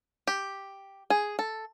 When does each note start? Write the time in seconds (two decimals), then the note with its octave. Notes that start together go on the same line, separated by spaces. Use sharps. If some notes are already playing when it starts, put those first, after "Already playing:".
0.27 G4
1.10 G#4
1.39 A4